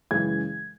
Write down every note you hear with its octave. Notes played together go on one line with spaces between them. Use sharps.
F#2 C#3 E3 G#3 G#6